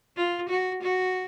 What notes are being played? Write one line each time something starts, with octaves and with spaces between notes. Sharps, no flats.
F4
F#4
F#4